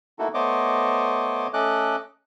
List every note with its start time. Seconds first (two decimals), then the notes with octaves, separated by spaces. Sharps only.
0.19 A3 A#3 D#4 E4 F#4 A4
0.34 A3 B3 C5 C#5 D#5 D6
1.53 A3 C#4 A4 D#5 D6 F#6